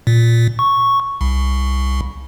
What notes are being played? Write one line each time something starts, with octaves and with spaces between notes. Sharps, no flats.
A#2
C#6
C2